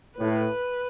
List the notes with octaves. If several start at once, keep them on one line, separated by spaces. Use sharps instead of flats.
A2 B4